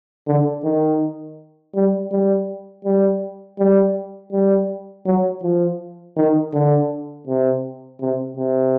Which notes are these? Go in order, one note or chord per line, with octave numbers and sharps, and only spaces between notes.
D3
D#3
G3
G3
G3
G3
G3
F#3
F3
D#3
D3
C3
C3
C3